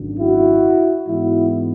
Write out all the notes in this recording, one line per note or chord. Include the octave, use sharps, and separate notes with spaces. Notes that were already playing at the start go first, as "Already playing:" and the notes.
Already playing: G#1 F#2 D3
E4 F#4
G#2 E3 G#3 B3 E4 F#4